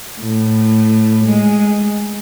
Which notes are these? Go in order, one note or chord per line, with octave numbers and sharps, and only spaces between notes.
A2
G#3